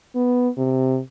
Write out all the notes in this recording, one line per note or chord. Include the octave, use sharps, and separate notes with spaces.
B3
C3